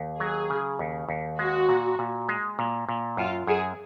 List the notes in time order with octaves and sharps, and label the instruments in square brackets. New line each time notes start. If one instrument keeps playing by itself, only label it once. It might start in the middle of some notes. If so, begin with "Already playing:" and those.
Already playing: [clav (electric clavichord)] D#2
[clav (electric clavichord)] F#3 [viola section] G#4
[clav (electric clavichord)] C#3
D#2
D#2
[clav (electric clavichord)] G#3 [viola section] F#4
[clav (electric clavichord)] A#2
A#2
G#3
A#2
A#2
[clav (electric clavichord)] F#2 [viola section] F4
[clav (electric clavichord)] F#2 [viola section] G#4